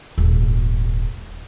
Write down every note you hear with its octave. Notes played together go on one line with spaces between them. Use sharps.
D#1 G#1